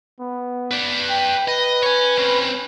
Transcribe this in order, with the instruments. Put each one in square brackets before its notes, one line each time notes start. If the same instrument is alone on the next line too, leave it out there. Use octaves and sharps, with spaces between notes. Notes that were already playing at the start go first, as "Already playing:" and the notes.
[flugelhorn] B3
[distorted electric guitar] B4 D5
[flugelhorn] G5
[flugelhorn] B4 [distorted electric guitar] D#5
[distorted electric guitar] C#5 G#5
C4 C#4